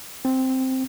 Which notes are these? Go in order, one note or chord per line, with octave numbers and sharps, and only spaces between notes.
C4